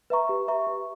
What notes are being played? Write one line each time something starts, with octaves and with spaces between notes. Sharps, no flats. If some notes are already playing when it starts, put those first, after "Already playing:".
B4 E5 A#5 C#6
G4
B4 E5 A#5 C#6
G4